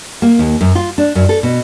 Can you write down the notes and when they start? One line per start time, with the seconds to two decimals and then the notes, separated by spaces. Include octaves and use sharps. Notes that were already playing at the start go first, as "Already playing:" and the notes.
0.22 A#3
0.39 D#2
0.61 F#2
0.75 F4
0.98 D4
1.15 F#2
1.29 A4
1.43 B2